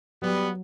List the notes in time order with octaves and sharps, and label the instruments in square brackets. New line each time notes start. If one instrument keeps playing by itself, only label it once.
[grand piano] F#3 [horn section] G3 B3